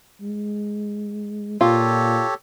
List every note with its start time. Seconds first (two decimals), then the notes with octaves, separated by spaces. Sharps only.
0.21 G#3
1.61 A#2 F4 G4 A4 C#5